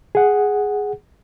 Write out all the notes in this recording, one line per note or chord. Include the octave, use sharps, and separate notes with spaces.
G#4 F#5